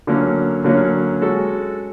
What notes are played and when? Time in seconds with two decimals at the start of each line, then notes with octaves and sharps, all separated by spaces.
0.07 D3 F#3 A#3 C#4
0.64 D3 F#3 A#3 C#4
1.21 G#3 C#4 F#4 A4